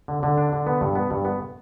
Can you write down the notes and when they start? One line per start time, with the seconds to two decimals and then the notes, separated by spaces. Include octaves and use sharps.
0.08 D3
0.23 D3
0.37 D4
0.53 D3
0.67 B3
0.81 G2
0.95 B3
1.11 G2
1.25 B3